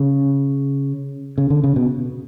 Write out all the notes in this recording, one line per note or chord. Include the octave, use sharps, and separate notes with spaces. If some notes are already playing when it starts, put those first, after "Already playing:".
Already playing: C#3
C#3
D3
C#3
B2